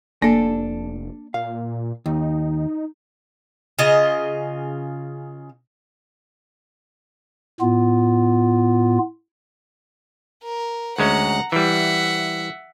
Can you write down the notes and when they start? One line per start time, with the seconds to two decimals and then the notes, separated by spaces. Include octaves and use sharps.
0.22 F1 A#3 D4 A4
1.34 A#2 F5
2.06 D#2 D#4
3.79 C#3 F4 D#5
7.61 A2 B3 F4
10.44 A#4
10.98 D2 G#3 C#4 F#5 A#5
11.52 E3 G3 E5 F#5